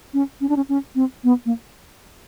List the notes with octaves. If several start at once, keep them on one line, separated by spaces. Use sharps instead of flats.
C#4
C#4
D4
C#4
C#4
C4
B3
A#3